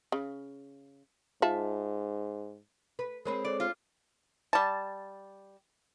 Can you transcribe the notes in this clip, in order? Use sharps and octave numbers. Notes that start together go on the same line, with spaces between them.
C#3
G#2 F4 E5 A5
B4
G#3 C4 G#4 A#4 C#5 B5
A4 C#5 D5
F4
G3 A5